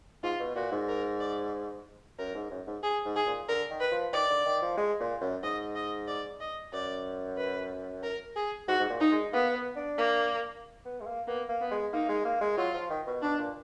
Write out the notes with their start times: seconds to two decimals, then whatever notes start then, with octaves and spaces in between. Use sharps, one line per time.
0.23 G#2 F4
0.40 B2
0.56 A#2 F#4
0.72 G#2
0.88 A#4
1.20 D5
2.18 F#2 A#4
2.34 G#2
2.51 F#2
2.67 G#2
2.83 G#4
3.05 G#2
3.16 G#4
3.27 A#2
3.48 D3 A#4
3.70 D#3
3.80 B4
3.91 F3
4.13 D#3 D5
4.30 D3
4.46 D#3
4.62 F3
4.77 G#3
5.00 A#2
5.21 F#2
5.43 G#2 D#5
5.76 D#5
6.08 D5
6.40 D#5
6.73 F#2 D5
7.37 B4
8.03 A#4
8.36 G#4
8.68 G#2 F#4
8.79 G#2
8.89 A#2
9.00 D#4
9.12 G#3
9.33 A#3 B3
9.55 B3
9.76 D4
9.98 A#3
10.85 B3
11.01 G#3
11.06 A#3
11.27 A#3 B3
11.49 A#3
11.61 B3
11.71 G#3
11.93 A#3 D#4
12.09 G#3
12.25 A#3
12.41 G#3
12.57 F#3 F4
12.74 F3
12.90 D#3
13.07 B2
13.22 B2 D4
13.39 A#2